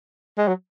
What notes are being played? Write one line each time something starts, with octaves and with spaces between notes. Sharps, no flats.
G#3
F#3